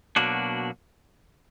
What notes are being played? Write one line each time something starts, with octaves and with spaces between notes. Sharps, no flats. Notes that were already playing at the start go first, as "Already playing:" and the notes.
B2 F#3 A#3 D4 F#4